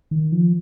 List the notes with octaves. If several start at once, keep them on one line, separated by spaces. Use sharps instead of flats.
D#3
F3